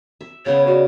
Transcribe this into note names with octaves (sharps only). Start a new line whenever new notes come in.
E5
C#3 B3 C#5
F#4 C#5 D5